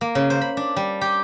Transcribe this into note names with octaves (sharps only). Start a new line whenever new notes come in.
A#3
C#3
C5
B5
D4
G3
G4